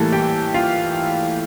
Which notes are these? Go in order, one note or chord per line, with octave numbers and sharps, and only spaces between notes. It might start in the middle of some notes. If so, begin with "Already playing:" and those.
Already playing: A2 E3 G3 A#3 A4 A5
G4 G5
F4 F5